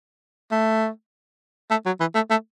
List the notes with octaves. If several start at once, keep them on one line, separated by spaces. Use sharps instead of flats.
A3
A3
F#3
E3
A3
A3